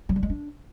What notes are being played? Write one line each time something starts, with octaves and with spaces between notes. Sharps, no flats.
F#3
G3
G#3
D4